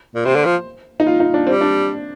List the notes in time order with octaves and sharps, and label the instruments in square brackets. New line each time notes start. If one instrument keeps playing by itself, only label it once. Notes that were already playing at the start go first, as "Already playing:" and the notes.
[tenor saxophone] A#2
[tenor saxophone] C3 [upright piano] C5
[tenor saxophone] D3
F3
[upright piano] D#4
F4
D#4
D4
[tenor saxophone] G3 [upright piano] C4
[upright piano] D4